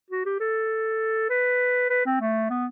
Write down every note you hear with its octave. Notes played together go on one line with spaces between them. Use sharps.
F#4
G4
A4
B4
B4
C4
A3
B3